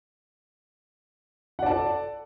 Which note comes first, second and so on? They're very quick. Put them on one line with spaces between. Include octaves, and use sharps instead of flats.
F#5 D5 A5 A4